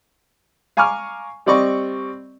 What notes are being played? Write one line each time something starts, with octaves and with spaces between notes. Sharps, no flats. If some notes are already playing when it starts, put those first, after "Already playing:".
F5 G#5 A#5 C#6 D6 F6
G3 C4 D5 D#5 C#6